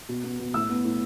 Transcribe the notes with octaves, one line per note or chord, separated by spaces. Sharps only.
B2
B3
B2
A2 E6
B3
A2